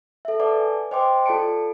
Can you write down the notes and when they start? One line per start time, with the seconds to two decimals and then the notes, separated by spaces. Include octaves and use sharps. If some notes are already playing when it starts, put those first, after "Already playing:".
0.25 A4 E5
0.40 B4 D5 F#5 A5 D6
0.60 G#5
0.91 C5 D#5 G5 C6 D6
1.26 F4 A4 D5 A5 C#7 D7